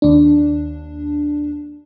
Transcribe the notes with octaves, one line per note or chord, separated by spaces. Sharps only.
D#2 D4